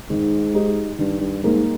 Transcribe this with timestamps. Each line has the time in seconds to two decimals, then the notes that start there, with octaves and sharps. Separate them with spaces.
0.09 G#2 D#3
0.54 G#3 D#4 G4
0.98 G2 D#3
1.20 G2
1.43 G#2 G3 A#3 D#4 G#4